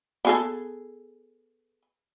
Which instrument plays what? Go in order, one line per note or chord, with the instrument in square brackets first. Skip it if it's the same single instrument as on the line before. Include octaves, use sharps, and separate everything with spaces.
[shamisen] B3 G#4 A4